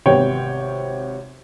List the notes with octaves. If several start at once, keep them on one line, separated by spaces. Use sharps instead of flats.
G#1 C3 B3 C#5 G5